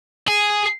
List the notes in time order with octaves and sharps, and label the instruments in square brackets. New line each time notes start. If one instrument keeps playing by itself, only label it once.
[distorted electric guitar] G#4